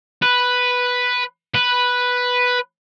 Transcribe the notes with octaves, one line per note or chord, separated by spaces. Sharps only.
B4
B4